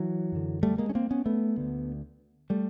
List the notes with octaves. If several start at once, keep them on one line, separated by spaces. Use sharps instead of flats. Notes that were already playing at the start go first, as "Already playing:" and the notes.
Already playing: E3 F#3
F#2 D3
G3 A3
G#3 A#3
C#4
A#3 C4
B3 C#4
A3 B3
D2 D3
G3 A3